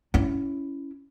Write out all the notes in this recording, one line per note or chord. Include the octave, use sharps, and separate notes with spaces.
C#4 E4